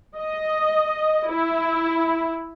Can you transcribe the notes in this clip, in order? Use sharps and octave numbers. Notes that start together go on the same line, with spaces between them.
D#5
E4